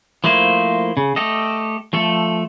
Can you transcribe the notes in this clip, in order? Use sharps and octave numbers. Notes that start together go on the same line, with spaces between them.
F3 A3 A#3 E4 C5
C#3
A3 G4 A4 D#5
F3 A3 A4